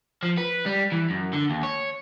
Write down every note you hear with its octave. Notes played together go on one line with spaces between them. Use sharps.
F3
B4
G3
E3
F#2
D3
D#2
C#5